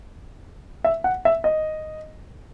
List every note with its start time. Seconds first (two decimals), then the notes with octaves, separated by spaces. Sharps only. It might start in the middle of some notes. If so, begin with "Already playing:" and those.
0.84 E5
1.04 F#5
1.25 E5
1.44 D#5